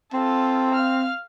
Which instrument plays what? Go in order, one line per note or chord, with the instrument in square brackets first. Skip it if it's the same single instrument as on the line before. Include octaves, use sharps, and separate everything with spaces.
[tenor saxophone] C4 [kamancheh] F4 A4
[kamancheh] F5 F6